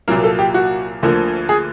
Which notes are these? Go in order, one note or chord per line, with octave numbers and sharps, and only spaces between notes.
C2 A#2 F#3 A#3 A#4
A4
G4
F#4
D2 D3 F3 A#3
G#4